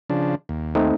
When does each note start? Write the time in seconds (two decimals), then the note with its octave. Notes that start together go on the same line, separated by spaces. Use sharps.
0.10 C#3 F3 D4
0.49 D#2
0.75 A3 C4 D#4